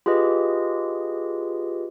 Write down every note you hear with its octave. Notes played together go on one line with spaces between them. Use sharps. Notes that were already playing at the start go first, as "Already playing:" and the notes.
F4 G4 G#4 B4 D#5